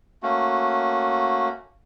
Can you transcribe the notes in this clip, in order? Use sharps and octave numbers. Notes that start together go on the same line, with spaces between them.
A3 A#3 C#4 F#4